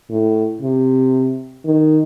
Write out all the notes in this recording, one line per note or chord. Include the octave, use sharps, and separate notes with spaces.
A2
C3
D#3